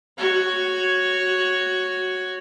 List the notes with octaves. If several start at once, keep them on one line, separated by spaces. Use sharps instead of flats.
F#4 C#5